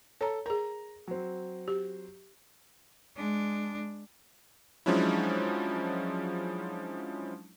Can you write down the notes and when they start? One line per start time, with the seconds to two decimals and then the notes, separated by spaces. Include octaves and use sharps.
0.21 A4 C#5 A#5
0.46 G#4 A#4 A#5
1.07 F#3 C4
1.68 G4
3.16 G#3 D4
4.86 F3 F#3 G#3 C#4 D4 E4